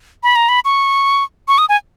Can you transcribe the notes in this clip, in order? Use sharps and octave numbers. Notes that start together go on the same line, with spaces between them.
B5
A#5
B5
C#6
C#6
D#6
G#5